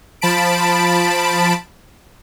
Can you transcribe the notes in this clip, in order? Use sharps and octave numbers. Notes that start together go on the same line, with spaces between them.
F3 A5 B5 D7